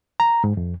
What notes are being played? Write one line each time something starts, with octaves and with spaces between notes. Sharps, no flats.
A#5
G#2
F2